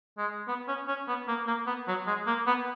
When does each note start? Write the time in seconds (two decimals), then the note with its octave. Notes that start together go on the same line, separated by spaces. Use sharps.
0.18 G#3
0.48 B3
0.68 C#4
0.88 C#4
1.08 B3
1.28 A#3
1.47 A#3
1.67 B3
1.88 F#3
2.07 G#3
2.27 A#3
2.47 B3